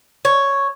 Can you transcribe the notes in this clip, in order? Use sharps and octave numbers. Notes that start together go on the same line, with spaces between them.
C#5